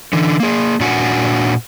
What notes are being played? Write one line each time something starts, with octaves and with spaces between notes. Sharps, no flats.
D3 E3
A#3 G#4
A#2 D4 F#4 F#5 G#5